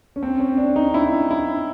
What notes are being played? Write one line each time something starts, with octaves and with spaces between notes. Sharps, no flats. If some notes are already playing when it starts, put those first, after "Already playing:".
C#4
C4
C#4
D4
D#4
E4
E4